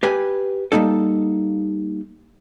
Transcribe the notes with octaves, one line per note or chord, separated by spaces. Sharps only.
G4 B4 G#5
G3 A#3 D#4 A4